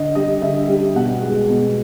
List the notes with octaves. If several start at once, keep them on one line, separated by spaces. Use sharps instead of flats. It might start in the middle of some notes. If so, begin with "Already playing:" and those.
Already playing: D3 D#5
G3 D#5
D3 E5
G3
B2 F#5
G#3
B2